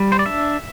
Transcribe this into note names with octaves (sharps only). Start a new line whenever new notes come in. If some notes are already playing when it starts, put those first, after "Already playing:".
Already playing: G3
C5
D5
D4 E5